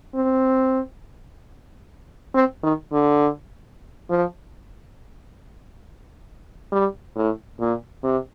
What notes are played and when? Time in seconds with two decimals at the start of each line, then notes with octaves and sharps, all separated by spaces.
0.15 C4
2.34 C4
2.63 D#3
2.93 D3
4.10 F3
6.72 G3
7.16 A2
7.60 A#2
8.03 C3